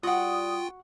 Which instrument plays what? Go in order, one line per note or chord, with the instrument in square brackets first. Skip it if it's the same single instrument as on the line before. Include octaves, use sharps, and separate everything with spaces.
[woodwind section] G3 D#6 [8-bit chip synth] F4 G5 [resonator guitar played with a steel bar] F#4 F#5